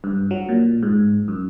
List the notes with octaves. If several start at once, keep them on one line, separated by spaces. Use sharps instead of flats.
G2
F#3
A#2
G#2
F#2